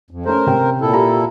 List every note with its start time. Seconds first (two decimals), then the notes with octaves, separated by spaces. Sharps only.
0.11 F2
0.25 A3 C#4 A#4 C5
0.47 C3 G5
0.81 A#2 E4 A4
0.93 G4 A#5